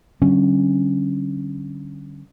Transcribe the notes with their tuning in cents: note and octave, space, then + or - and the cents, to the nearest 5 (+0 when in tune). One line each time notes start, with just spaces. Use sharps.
D3 +0 G3 -40 C#4 -15